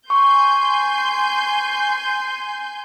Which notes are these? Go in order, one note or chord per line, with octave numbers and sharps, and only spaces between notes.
G#5 C6 C#6 G6